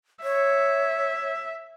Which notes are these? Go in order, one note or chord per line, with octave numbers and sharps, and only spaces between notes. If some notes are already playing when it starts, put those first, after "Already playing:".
C#5 E5